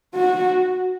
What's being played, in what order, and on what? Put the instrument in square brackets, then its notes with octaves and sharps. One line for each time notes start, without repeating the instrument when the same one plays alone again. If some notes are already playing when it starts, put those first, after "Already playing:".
[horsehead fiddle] F#4